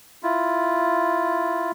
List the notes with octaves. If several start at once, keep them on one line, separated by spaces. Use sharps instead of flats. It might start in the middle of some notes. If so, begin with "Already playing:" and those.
E4 F4